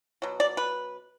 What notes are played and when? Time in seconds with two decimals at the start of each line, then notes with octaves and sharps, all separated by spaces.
0.22 B2 F#3
0.40 D5
0.57 B4